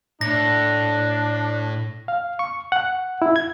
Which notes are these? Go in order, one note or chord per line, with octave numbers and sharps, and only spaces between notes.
A2 D4 A#6
F5
C#6
F#5
E4
G#6